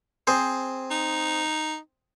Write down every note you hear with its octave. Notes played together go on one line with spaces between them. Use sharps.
C4 G#4 C5
D#4